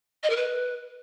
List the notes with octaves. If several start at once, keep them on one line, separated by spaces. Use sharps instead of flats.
D#5
A#4
B4